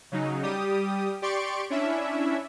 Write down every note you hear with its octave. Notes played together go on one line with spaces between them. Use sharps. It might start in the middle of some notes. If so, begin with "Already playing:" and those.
C#3 F#3 D#4
G3 G4 D#6
G4 D5 C6 C#6 D7
C#4 D4 E4 E5